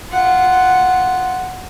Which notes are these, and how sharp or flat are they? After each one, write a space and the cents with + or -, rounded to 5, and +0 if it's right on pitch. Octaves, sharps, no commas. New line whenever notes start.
F4 -10 F#5 +0